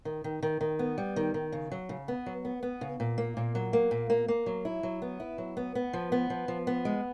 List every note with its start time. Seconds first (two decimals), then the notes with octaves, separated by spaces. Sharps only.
0.05 D#3
0.24 D#3
0.43 D#3
0.61 D#3
0.79 B3
0.98 G3
1.16 D#3
1.34 D#3
1.52 C#3
1.72 F#3
1.89 C#3
2.08 B3
2.26 F#3
2.45 B3
2.63 B3
2.81 C#3
3.00 A#2
3.18 A#3
3.37 A#2
3.55 F#3
3.73 A#3
3.91 A#2
4.10 A#3
4.28 A#3
4.46 F#3
4.65 E4
4.83 F#3
5.02 B3
5.20 E4
5.38 F#3
5.57 B3
5.75 B3
5.93 F3
6.12 B3
6.30 F3
6.48 F3
6.67 B3
6.85 G#3